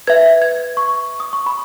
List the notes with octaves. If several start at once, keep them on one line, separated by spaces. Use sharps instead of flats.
B4 E5 G#6
G#6
C#6
D#6
C#6
B5